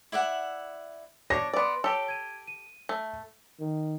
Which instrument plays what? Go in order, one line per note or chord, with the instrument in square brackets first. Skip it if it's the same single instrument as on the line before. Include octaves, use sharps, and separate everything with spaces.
[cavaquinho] E4 D5 E5 F#5
[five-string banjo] D4 C#5 [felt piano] A#6
[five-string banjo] B3 D5 [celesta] B4 C6
[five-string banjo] G4 A4 [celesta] C#5
[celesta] G#6 D#7
D#7
[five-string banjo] A3 [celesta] E5
[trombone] D#3